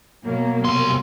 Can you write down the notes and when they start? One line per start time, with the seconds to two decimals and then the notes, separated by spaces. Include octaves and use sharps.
0.25 B2 F#3 A#3
0.64 C2 C6